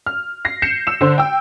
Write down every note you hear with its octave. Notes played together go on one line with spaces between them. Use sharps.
F6
A#6 C7
G6 C7 C#7 E7
E6 E7
D3 C5
G5 E6